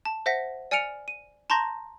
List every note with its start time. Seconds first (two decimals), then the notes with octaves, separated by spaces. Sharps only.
0.05 A5
0.26 C5 E5 F#5 A#6 B6
0.71 D5 G#5 F6 C#7 D7 F7
1.08 D#7
1.50 A5 A#5 C6 C#6 G6 A#6